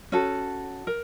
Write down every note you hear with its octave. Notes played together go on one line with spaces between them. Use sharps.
C#4 F#4 A4
A#4